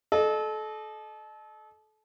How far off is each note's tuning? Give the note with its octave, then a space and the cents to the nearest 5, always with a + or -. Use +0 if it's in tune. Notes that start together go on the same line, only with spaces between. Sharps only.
A4 -30 D#5 -30